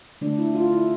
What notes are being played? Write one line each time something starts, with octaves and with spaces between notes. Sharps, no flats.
D3 A3 D4
E4
F4
E4